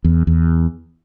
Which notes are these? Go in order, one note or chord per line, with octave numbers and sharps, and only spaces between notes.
E2
E2